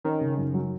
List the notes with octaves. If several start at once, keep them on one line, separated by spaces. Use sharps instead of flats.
D#3 C#4
C#3
F#2
F#3